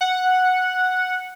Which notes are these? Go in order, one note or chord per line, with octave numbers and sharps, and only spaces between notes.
F#5